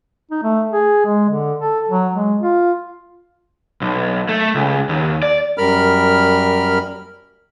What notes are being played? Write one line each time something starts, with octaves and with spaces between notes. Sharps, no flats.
D#4
A3
G#4
G#3
D3
A4
F#3
G#3
F4
B1
A3
C#2
D#2
D5
F#2 G3 A#4 B5 F6